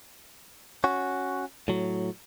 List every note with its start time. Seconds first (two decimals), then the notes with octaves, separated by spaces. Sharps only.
0.84 C#4 F#4
1.68 A2 F#3